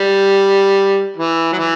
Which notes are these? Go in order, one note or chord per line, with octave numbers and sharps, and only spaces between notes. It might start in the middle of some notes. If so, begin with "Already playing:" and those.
Already playing: G3
E3
F#3
E3